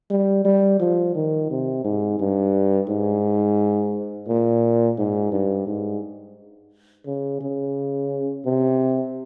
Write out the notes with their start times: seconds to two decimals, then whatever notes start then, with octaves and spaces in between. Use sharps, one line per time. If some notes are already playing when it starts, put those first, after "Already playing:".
0.10 G3
0.45 G3
0.80 F3
1.15 D#3
1.50 C3
1.84 G#2
2.20 G2
2.89 G#2
4.28 A#2
4.98 G#2
5.32 G2
5.67 G#2
7.06 C#3
7.41 C#3
8.45 C3